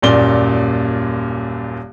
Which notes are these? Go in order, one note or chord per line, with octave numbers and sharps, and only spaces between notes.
D#1 F#2 A#2 D5 G7